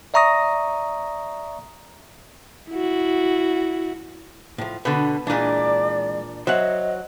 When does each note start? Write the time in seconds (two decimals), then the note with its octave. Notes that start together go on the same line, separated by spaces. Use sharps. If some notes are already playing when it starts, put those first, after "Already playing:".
0.14 D5 E5 A#5 C#6 D#6 A#6
2.71 E4 F#4
4.58 A2 F3
4.85 B2 D3 B3
5.27 A#2 E3 G#3 D4 D5
6.47 F#3 C5 D#5 E5 F#5